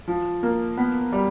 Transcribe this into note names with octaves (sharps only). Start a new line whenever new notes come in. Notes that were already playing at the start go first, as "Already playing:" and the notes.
F3
A#3
B3
G3